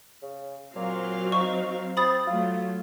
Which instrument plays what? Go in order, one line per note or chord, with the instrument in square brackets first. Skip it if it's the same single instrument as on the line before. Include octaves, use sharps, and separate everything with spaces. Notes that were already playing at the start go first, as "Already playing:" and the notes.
[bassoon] C#3
[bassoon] A#2 [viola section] F#3 C4 F5
[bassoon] D#4 [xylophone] C#6
[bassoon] C4 [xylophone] B5 D#6 A6
[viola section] F#3 A3 [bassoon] F4